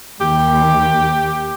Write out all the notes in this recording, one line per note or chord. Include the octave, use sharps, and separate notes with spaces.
D#2 G4